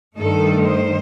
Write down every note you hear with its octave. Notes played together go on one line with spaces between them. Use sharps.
G2 D#3 A3 D#4 A4
C5